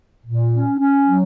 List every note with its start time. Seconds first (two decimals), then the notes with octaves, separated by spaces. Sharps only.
0.25 A#2
0.52 C#4
0.79 C#4
1.06 F#3